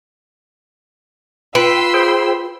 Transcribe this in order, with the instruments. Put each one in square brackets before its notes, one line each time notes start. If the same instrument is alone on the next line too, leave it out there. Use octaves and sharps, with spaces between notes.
[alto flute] F4 [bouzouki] B4 [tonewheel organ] G5 [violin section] B5 C6 E6
[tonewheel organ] G#4 C5 G5